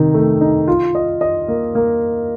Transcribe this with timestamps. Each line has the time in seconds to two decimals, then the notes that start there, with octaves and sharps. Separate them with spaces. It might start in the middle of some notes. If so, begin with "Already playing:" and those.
Already playing: C3 D#3 D#4
0.14 A3
0.41 D#4
0.68 F4
0.95 D#5
1.21 D#5
1.48 A#3
1.75 A#3